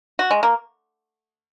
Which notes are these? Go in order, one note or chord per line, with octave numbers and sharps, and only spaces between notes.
F#4
G#3
A#3